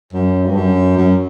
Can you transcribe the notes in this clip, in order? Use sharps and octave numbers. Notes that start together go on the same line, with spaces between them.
F#2
G2
F#2
F#2